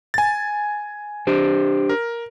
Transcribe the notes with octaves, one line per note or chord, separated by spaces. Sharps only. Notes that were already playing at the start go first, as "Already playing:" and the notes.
G#5 A6
D4 G4 C5
A#4